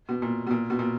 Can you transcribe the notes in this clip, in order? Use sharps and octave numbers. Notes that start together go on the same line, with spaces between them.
B2
A#2
B2
A#2
B2
A#2